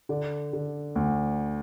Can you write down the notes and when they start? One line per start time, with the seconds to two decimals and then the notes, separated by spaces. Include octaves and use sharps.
0.09 D3 D5
0.53 D3
0.95 D2